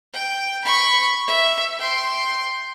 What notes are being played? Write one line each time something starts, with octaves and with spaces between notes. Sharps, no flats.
G5
B5 C#6
E5
G5 C6